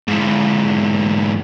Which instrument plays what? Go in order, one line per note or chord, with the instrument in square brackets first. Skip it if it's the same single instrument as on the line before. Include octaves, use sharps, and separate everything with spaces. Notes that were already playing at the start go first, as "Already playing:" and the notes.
[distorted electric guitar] G#2 E3